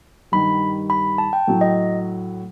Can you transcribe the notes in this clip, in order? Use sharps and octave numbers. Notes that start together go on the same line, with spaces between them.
G2 D#3 G3 B5
B5
A5
G5
A2 F#3 A3
D#5